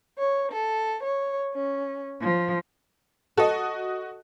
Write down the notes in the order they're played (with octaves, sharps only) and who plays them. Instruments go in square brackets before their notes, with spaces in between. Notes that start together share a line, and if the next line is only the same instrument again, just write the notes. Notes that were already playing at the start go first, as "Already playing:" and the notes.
[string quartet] C#5
A4
C#5
C#4
F3
[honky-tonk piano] F#4 D#5 [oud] A4